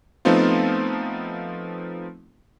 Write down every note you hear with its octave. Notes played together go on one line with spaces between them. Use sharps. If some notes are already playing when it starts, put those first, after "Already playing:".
F3 A3 B3 C4 D#4 F4